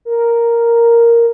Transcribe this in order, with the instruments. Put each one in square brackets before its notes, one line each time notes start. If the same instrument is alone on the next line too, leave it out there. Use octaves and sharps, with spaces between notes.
[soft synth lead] A#4